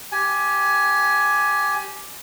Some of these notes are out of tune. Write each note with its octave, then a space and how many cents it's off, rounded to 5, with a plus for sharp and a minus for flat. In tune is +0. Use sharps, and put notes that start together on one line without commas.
G4 +0 G#5 +15